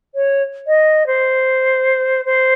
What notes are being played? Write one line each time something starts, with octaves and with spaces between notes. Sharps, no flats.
C#5
D#5
C5
C5